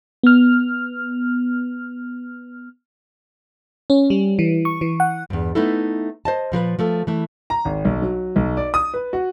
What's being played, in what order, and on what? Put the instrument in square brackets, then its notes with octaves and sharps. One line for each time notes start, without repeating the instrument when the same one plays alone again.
[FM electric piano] B3 F6
C#4
G3
E3
C#6
E3
F#5
[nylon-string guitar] E2 G2
A3 B3 D#4 E4 A4
C5 D#5 A5
A#2 F3 A#4 B4
F3 A3 A4
E3 A3
[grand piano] A#5
G#1
B1
F#3
B1
D5
D#6
B4
F#4